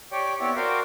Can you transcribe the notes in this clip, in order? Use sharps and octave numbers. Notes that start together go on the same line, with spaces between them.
G4 C#5 D5 G5
B3 C4 E4 G4 C#5 D5
F#4 A#4 C5 D5 F5 G5